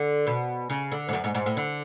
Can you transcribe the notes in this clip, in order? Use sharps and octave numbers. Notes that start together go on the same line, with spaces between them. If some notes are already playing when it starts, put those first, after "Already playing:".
Already playing: D3
B2
C#3
D3
G#2
F#2
G#2
G#2
A2
D3